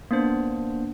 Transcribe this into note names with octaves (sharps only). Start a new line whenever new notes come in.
A#3 B3 D4 C5